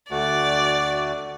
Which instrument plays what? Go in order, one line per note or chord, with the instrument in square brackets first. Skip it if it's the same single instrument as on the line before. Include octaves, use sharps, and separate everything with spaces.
[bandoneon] D2 A3 F#4 [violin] D5